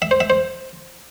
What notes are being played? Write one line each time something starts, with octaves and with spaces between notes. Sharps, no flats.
E5
C5
E5
C5